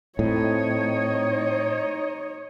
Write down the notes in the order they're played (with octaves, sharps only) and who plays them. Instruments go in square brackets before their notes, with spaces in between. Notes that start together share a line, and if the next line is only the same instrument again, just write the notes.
[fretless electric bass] A2 [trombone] C4 [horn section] D#4 D#5 [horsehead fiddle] C#5